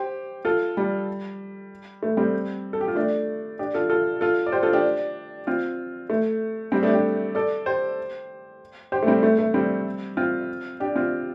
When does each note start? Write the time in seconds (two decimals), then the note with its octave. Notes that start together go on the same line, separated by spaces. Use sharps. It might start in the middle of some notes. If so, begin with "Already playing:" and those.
Already playing: G4 C5
0.45 F4 A4
0.77 G3
2.03 A3
2.17 G3 C4
2.73 A4
2.81 G4
2.88 F4
2.96 A3 D4
3.59 D4 G4
3.74 F4 A4
3.90 F4 A4
4.21 F4 A4
4.46 D5
4.52 G4 C5
4.63 F4 A4
4.73 D4 G4
5.47 C4 F4
6.10 A3
6.72 G3 C4
6.83 A3 D4
6.93 D4 G4
7.35 A4 D5
7.66 G4 C5
8.92 G4 C5
9.03 A3
9.07 G3 C4
9.23 A3
9.39 A3
9.54 G3 C4
10.17 C4 F4
10.80 D4 G4
10.96 C4 F4